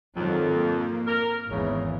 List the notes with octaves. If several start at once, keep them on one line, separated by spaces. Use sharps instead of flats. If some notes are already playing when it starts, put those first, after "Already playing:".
F2 G#2 D#3 F#3
A#3
A#4
G#1 E2 G#2 C#3 E3